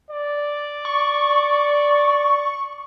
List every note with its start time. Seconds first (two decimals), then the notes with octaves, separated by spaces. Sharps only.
0.11 D5
0.85 C#6